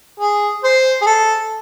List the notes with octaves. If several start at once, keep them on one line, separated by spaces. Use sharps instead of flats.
G#4
C5
G#4
A4